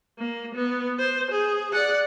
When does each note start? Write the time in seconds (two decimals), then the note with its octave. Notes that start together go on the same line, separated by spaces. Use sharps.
0.19 A#3
0.55 B3
0.99 C5
1.31 G#4
1.73 D5 F#5